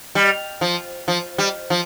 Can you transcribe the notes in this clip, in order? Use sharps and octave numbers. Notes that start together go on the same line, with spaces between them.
G3
F3
F3
G3
F3